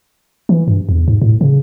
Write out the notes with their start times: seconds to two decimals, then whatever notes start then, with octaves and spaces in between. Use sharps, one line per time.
0.49 E3
0.68 G2
0.89 E2
1.08 G#2
1.22 A2
1.41 C#3